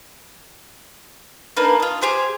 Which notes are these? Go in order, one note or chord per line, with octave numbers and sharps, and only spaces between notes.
A#3 D4 D#4 B4
F4 D#5
G4 G#4 C5 G5